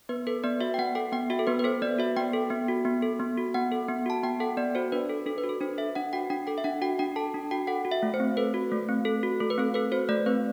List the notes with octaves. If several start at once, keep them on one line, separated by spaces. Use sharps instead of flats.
B3 B4
A4 B4
B3 D5
F#4 E5
G5
B3 F#5
A4 G5
B3 G5
F#4 E5
A4
B3 B4
B4
A4 C5
B3 D5
F#4 E5
B3 G5
A4
B3
F#4
B3
A4
B3
F#4
B3 F#5
A4
B3
F#4 A5
B3 G5
A4 F#5
B3 D5
F#4 C5
D4 B4
A4
D4 A4
B4
F#4
A4
D4 C5
A4 E5
D4 F#5
F#4 G5
D4 G5
A4 G5
E5
D4 F#5
F#4 G5
D4 G5
A4 A5
D4
F#4 G5
A4 F#5
F#4
E5
A3
C5
C4
A4 B4
F#4
A3
C4
A4
F#4
A3 A4
B4
C4 A4
A4 B4
F#4 C5
A3 D5
C4 B4